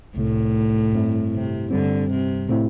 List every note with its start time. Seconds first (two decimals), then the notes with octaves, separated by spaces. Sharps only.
0.16 C2 A2 C3 A3
0.93 G2 G3 C4 E4
1.33 C3
1.70 G2 D3 G3 C4
2.10 C3
2.49 A2 A3 C4 E4